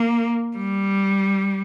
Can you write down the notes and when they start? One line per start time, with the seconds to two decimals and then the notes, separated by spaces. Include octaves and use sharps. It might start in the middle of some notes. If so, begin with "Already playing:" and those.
Already playing: A#3
0.57 G3